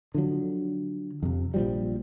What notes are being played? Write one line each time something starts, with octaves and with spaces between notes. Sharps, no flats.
D3 F3 F#3
F2 C3
A#1 F3 G3